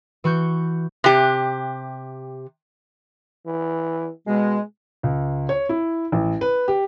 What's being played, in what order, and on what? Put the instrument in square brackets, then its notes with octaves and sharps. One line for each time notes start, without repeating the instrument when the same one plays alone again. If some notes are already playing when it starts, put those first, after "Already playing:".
[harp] E3 F#4 C#6 G6
[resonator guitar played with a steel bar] C3 G4
[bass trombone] E3
[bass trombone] B2 [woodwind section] G#3
[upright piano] C#2
C#5
E4
A1
B4
G4